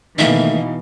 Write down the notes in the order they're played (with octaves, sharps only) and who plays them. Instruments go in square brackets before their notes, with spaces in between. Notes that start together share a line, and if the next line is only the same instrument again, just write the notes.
[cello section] B2 E3 [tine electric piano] D#3 A3 A#3 [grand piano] D#4 F5 [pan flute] E5